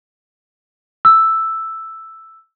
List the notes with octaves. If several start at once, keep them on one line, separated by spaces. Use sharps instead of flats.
E6